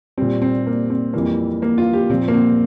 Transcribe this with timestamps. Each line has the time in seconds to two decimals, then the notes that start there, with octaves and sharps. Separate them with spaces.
0.18 A#2 G3 C4
0.42 C4
0.66 A#3
0.90 C4
1.13 F2 E3 G3 A#3
1.62 A#3
1.78 F4
1.93 G4
2.10 A#2 F3 C4
2.28 A#3
2.34 C4